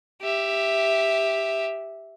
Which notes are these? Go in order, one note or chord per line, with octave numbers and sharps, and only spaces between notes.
G4 E5